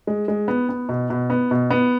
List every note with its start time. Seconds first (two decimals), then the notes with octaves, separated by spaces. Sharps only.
0.07 G#3
0.28 G#3
0.48 B3
0.69 B3
0.89 B2
1.10 B2
1.30 B3
1.51 B2
1.70 B3